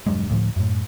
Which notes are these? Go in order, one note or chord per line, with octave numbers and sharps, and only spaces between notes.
E1 G2 F#3 G#3
D2 A2 F3
F#2 A2